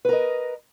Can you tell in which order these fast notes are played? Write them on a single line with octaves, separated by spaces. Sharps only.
B4 A#4 D#5